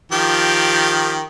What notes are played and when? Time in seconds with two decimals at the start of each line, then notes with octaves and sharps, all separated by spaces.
0.12 D#3 F3 G4